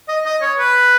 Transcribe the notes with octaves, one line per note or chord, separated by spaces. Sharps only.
D#5
D#5
C#5
B4